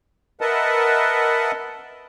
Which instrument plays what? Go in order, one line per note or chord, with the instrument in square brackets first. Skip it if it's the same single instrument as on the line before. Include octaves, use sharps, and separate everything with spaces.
[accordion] A#4 B4 D#5 E5 F#5 A5